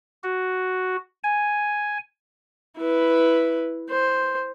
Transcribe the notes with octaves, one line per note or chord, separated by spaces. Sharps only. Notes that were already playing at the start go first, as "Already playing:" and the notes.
F#4
G#5
E4 B4
C5